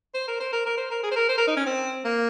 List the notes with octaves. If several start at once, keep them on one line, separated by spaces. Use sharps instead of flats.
C5
A#4
C5
A#4
A#4
C5
A#4
G#4
C5
A#4
C5
A#4
D#4
C#4
C4
A#3